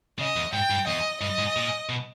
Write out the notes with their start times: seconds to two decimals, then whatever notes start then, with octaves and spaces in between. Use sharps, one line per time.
0.19 C#3 D#5
0.36 E2
0.53 G#2 G5
0.70 G2
0.87 E2 D#5
1.21 G2 D#5
1.39 G#2
1.56 A#2
1.89 B2